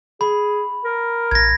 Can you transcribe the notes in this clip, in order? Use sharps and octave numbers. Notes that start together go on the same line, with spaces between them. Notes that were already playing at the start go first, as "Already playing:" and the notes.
G#4 B5
A#4
A1 G#6 A#6